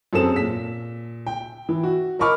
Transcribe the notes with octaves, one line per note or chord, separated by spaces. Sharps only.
F#2 C4 G#4 A4 E7
A#2 B6
G5
E3
F#4
A#4 D#5 B5 C#6 D6 F6